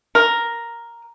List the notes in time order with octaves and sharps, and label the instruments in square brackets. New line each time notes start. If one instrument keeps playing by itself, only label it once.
[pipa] A#4